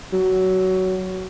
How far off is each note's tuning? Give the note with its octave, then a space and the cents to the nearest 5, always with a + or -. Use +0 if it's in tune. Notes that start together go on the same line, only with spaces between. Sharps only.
F#3 +15